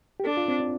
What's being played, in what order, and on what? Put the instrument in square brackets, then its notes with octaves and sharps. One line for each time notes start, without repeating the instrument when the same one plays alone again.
[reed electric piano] G4
[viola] D4 [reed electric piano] A4
[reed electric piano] F4
C4
D4